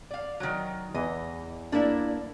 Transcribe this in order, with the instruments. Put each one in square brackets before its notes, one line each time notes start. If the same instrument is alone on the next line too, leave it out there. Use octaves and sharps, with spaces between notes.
[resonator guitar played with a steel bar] D5 F5
D#3 F#3
[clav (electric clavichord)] E2 E3 [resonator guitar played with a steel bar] D#5
[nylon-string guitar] A#3 D4 [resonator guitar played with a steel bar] E4 D5